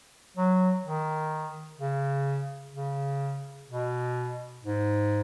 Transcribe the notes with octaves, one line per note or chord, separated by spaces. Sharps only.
F#3
D#3
C#3
C#3
B2
G#2